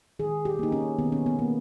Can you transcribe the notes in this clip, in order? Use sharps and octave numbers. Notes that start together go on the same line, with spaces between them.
D#3 G#4
G4
A#3 D#4
C#4
D#3 B3
C#4
B3
A#3